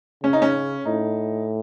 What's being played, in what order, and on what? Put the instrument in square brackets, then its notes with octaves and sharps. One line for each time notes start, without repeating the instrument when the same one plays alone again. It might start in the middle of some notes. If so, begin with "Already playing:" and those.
[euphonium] C#3 [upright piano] C#4
[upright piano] D#4
C#4
[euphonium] A2 [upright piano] D#4